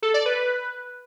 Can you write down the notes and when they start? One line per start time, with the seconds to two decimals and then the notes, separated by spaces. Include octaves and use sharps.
0.02 A4
0.14 D5
0.26 B4